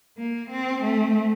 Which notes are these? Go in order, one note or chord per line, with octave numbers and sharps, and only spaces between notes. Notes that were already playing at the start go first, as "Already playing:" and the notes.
A#3
C4
A3